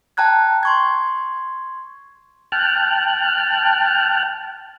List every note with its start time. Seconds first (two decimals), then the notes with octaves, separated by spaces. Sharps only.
0.17 G5 A5 A#5 F#6 G#6
0.63 C6 C#6 G#6
2.52 G5 A5 F6 F#6